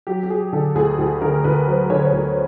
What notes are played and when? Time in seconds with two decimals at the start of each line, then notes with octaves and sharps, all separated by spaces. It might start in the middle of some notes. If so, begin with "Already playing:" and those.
0.07 F#3 G4
0.23 G4
0.30 F#3 G#4
0.53 D3 A4
0.75 D2 G#4
0.98 D2 G4
1.22 D3 A#4
1.44 D2 B4
1.67 F#3 C5
1.90 D3 C#5
1.98 C5
2.05 C#5
2.13 D2